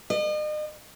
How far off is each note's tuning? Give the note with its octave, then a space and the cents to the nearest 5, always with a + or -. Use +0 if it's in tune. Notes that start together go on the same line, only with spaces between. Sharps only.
D#5 -40